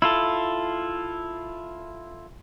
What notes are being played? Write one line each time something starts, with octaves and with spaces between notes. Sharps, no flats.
E4 F4 A4